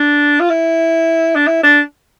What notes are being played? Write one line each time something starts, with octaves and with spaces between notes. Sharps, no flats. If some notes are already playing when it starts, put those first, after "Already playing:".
Already playing: D4
F4
E4
D4
E4
D4